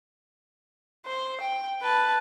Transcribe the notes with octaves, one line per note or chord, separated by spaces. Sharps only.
C5
G5
B4 A5